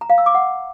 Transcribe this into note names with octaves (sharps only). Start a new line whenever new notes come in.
A#5
F5
E6
D6
F#5